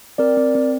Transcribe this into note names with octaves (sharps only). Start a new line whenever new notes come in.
C4 A#4 D5
C4
C4